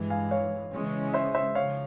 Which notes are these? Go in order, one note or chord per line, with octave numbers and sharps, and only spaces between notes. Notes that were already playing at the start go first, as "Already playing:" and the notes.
Already playing: G2 E3 G#3
F5 G#5
C#5 F5
C#3 E3 G#3 C#4
C5 E5
C5 E5
C#3 F3 C#5 F5